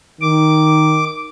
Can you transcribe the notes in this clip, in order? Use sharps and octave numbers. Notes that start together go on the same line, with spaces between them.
D#3 D6